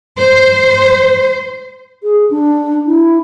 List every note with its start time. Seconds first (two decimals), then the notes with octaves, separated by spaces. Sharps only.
0.19 C5
2.03 G#4
2.31 D4
2.87 E4